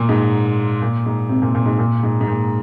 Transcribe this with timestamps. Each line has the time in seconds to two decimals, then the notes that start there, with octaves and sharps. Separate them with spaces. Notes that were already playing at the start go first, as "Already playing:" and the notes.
Already playing: A#2
0.09 G#2
0.82 A#2
1.06 G#2
1.29 C3
1.42 A#2
1.55 A#2
1.66 G#2
1.79 A#2
2.03 G#2
2.21 G#2
2.27 A#2